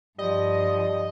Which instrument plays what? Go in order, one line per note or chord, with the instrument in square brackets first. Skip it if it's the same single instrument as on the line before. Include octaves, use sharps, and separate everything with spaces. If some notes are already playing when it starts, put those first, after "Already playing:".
[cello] G2 F3 [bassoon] G3 [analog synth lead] D#5